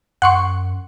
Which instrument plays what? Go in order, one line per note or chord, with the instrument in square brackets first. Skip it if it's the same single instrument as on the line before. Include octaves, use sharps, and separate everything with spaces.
[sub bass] F#2 [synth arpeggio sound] F#5 C6 C#6